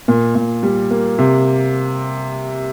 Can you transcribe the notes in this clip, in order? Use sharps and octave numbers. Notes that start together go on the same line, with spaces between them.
A#2
A#2
G3
A#3
C3